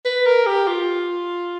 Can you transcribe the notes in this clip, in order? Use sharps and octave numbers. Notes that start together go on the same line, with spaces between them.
B4
A#4
G4
F4